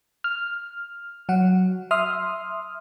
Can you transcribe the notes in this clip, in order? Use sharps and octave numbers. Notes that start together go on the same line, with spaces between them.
F6
F#3 F#4 F#5
E5 C6 D#6 F6